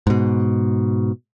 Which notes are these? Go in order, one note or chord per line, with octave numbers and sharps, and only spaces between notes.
G#2 B2